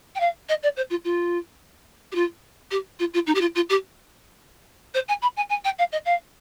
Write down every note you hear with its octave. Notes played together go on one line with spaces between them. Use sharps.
G5
F5
D#5
D5
C5
F4
F4
G4
F4
G4
F4
F4
D#4
G4
F4
F4
G4
C5
G#5
B5
G#5
G#5
G5
F5
D#5
F5